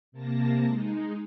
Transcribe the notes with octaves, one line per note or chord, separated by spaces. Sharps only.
C3 A#3 A5 A#6
G#3 D#4